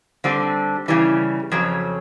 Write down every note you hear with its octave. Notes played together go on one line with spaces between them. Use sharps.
D3 G3 C4
C#3 E3 G3
F2 C#3 F#3